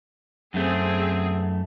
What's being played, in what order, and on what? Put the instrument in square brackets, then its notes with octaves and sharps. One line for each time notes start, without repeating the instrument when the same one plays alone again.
[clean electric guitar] F#2 A3 [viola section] C4 G#4